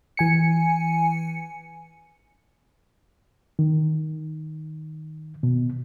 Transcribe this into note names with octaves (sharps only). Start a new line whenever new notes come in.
E3 G#5 C#7
D#3
B2